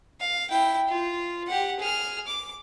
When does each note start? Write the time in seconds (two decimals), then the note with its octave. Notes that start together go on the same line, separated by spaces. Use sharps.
0.20 F5
0.50 E4 G5
0.88 F4
1.47 G4 F#5
1.79 G#4 F6
2.27 D6